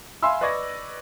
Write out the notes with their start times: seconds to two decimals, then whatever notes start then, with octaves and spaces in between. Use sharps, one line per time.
0.23 E5 F5 G#5 B5 C6 E6
0.41 B4 D5 D#5 C#6 G#6 A#6